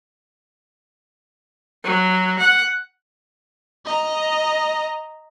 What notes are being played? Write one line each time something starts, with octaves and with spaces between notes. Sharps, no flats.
F#3
F#5
D#5 A#5